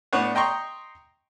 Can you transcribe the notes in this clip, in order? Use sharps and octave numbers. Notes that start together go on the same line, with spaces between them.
A2 B3 D4 C#5 F#5
D#5 G5 A#5 C6 C#6